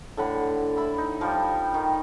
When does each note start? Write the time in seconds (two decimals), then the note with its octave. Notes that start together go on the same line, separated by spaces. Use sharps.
0.17 A2 D3 F#5 B5
0.77 E4 E5 B5
0.98 D#4
1.21 F3 G3 G5
1.74 D#3